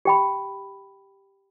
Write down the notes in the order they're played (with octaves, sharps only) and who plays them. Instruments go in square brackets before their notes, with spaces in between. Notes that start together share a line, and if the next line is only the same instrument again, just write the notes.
[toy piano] G4 G5 B5